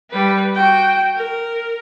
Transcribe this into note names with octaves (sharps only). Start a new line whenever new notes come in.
G3 B4
F#4 G5
A#4